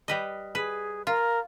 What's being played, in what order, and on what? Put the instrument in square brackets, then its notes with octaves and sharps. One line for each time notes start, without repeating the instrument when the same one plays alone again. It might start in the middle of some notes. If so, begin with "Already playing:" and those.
[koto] G3 B4 D#5
[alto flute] G#4 [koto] B4
[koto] F4 [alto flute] A#4